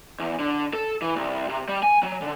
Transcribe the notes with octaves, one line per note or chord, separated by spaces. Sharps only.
E2
D3
A4
E3
C2
C3
G3
G#5
F#3
D3